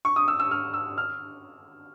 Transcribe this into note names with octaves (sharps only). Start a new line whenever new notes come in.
C#6
D#6
E6
E6
F6
E6
F6